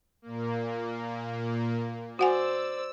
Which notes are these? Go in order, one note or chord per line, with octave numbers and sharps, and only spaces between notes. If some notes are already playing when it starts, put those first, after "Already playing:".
A#2 A#3
F#4 C5 D5 F#5 G#5 E6